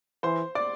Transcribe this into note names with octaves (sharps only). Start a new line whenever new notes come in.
E3 C5 C6
D5 D6